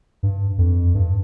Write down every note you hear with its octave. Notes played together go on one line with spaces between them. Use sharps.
G2
F2
G2